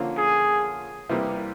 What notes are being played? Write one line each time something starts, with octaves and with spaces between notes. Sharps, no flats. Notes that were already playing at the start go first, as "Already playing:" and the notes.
Already playing: D3 F3 A#3 C#4 F4
G#4
C3 E3 G3 A#3